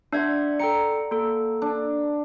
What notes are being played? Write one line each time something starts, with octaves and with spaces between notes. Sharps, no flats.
D4 D5 E5 F#5 C6 G#6
A4 G5 A#5 C#7
A#3 A4
D4